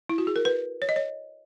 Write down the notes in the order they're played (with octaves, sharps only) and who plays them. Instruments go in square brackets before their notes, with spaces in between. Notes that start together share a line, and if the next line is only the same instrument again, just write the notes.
[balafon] E4
F#4
G#4
A#4
B4
C#5
D#5
C#5